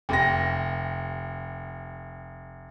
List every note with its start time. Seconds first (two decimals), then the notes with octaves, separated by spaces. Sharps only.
0.09 F1 G5 A#6